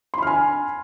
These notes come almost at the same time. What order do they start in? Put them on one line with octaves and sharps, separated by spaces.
C6 B5 F6 G#5